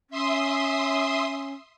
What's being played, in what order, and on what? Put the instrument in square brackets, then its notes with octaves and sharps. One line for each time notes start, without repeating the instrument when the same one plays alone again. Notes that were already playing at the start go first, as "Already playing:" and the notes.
[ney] C#4 [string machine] E5 C6 D#6